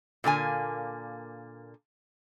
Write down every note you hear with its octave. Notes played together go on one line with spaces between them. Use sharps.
A#2 D3 A#3 G#5